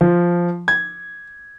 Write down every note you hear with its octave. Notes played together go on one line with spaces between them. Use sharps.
F3
G#6